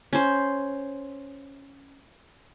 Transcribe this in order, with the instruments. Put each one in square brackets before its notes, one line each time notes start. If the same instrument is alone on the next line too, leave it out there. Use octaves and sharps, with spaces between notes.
[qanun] C#4 C5